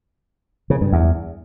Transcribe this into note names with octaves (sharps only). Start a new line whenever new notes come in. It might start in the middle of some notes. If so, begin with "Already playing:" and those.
C#3
G2
E2